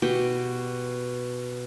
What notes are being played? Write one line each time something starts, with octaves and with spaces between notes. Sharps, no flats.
B2 F#4 G4 G5